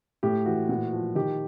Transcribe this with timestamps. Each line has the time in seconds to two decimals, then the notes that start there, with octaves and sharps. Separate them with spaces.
0.23 A2 G4
0.46 E3 F#4
0.69 A#2 F#4
0.93 F3
1.15 D#3 G4